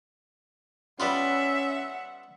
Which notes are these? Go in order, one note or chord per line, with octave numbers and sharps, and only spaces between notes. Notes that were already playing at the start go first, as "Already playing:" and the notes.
G3 B3 C#4 F4 E5 F#5